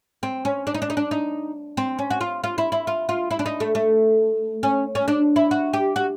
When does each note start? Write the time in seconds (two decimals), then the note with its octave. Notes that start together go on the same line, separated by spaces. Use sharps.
0.23 C4
0.45 C#4
0.67 D4
0.74 D#4
0.82 D4
0.90 D#4
0.97 D4
1.11 D#4
1.77 C4
1.99 C#4
2.10 F#4
2.21 F4
2.44 F4
2.58 E4
2.72 E4
2.87 F4
3.09 F4
3.31 E4
3.39 D4
3.46 D#4
3.60 A3
3.75 A3
4.63 C#4
4.95 C#4
5.08 D4
5.36 E4
5.51 F#4
5.73 G4
5.96 F#4